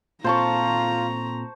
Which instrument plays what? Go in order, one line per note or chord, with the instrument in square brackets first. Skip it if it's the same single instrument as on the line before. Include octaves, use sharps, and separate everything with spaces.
[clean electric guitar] A#2 C4 A4 [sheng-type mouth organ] F4 [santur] C5 A5 C#6 [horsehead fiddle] A#5